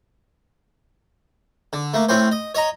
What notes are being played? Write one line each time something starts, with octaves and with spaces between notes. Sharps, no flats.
D3
A3 A#3
A2 C4 C#4 C5
D#5
C#5 D#5 A#5